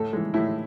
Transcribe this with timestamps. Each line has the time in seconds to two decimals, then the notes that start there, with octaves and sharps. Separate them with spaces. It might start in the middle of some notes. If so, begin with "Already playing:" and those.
Already playing: A2 A4
0.13 E3 G#3
0.34 A2 E4